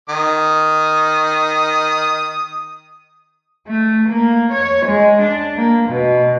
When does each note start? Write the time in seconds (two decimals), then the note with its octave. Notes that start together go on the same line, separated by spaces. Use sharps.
0.09 D#3 D#6
3.67 A3
4.09 A#3
4.52 C#5
4.86 G#3
5.21 D4
5.56 A#3
5.89 B2